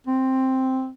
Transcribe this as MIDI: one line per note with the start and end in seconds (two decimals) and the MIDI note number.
0.07 0.90 60